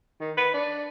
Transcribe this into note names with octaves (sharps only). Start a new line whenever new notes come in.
D#3
B4
D4